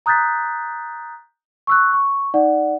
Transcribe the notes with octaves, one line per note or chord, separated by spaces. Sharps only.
A#5 D#6 F#6 G6 A6 B6
C#6 E6 F#6
C#6
D#4 D5 F#5